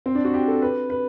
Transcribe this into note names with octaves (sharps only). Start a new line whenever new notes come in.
C4
D4
F#4
G4
A4
B4
B4